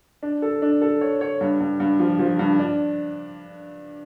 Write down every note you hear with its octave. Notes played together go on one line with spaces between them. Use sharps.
D4
A4
D4
A4
C#5
C#5
G2
G2
G2
F3
F3
G2
D4